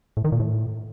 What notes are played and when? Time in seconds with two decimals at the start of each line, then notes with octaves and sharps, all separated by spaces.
0.17 A2
0.25 D#3
0.32 A#2
0.40 A2